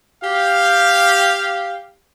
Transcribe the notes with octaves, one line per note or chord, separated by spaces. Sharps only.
G4 F5